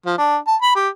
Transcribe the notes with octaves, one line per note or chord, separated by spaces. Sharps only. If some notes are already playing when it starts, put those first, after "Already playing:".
F3
D4
A5
B5
G4